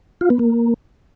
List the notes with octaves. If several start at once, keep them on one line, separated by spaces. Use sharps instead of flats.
F4
B3
A#3